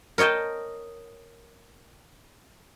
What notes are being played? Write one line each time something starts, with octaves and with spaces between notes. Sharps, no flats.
A#4 C#5 D#5 G5 A5